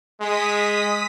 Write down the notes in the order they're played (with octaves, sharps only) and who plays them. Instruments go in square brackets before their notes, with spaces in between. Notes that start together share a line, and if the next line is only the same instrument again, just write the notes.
[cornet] G#3 [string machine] D#6 B6